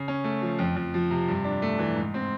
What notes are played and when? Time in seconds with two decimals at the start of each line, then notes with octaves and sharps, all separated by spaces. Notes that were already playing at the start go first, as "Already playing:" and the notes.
Already playing: C#3
0.08 C#4
0.24 A3
0.42 F3
0.59 F2
0.76 F2
0.94 F3
1.11 C3
1.28 G2
1.44 D4
1.62 A3
1.79 E3
1.96 G#2
2.14 C4